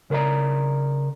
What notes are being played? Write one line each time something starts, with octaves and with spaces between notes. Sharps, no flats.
C#3 A#4 B4 D5 A#5